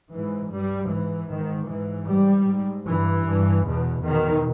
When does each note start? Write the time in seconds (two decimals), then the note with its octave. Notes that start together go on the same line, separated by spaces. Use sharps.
0.13 G#2 E3
0.52 G2 G3
0.91 G#2 E3
1.30 G#2 D#3
1.68 G#2 E3
2.08 G#2 G3
2.47 G#2
2.86 G2 E3
3.26 G2
3.65 E2 B2
4.03 E2 B2 D#3